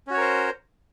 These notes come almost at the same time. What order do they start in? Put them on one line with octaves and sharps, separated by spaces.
C#4 F#4 C#5 A#4 C5